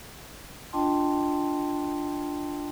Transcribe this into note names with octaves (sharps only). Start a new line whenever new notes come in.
D4 F4 D#5 G5 A5 C6